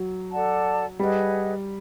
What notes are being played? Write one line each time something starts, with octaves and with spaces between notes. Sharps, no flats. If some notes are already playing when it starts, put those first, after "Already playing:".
Already playing: F#3
A4 D5 F#5 A5
G3 G#4 B4 D#5 F#5